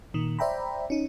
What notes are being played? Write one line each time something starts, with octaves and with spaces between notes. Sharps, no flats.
A#2 D#3
C5 D5 E5 G5 A#5 B5
C#4 D#4